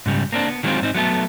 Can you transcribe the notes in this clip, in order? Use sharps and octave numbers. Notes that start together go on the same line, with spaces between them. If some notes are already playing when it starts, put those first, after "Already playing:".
G#2 C#3 G3
A#3 C4 D4
B3
D#3 F#3 G#3 A#3 C4 F4
G#2 C4 D#4
F#3 A3 B3 A4